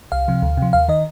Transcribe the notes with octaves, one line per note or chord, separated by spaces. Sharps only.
C2 F5
C3 F3
D2
C3 F3
D#2 F5
D#3 D#5